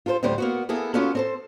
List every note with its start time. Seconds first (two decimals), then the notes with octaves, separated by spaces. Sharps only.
0.06 F4 A4 A#4 C5
0.23 D2 A2 D3 G3 C5
0.38 A#3 B3 F#4
0.69 A#3 B3 E4 G#4 A4
0.94 A#3 B3 C#4 F4 F#4 A4
1.15 C4 A4 C5